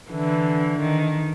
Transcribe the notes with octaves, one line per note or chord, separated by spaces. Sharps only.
D3 E3
D#3